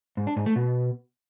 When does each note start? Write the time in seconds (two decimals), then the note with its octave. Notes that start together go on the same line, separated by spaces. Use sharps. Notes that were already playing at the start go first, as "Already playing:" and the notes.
0.17 G#2
0.27 D4
0.37 G#2
0.46 A3
0.56 B2